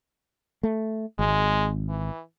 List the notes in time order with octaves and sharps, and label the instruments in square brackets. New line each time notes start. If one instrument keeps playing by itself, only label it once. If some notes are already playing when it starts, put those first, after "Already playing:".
[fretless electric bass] A3
[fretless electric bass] G#1 [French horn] G#3
[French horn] E3